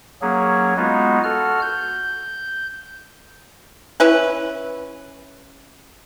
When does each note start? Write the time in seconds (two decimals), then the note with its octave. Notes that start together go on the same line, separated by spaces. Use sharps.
0.22 F#3 A#3 C#4 G#4
0.77 G#3 B3 D#4 F4 F#4
1.24 F#4 A4 F6
1.62 G6
4.00 C#4 E4 B4